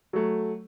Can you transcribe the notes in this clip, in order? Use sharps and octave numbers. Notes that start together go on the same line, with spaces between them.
F#3 A3